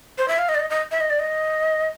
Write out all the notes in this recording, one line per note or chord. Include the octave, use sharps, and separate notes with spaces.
C5
E5
F5
D#5
D5
D#5
D#5
E5
D#5
D5
D#5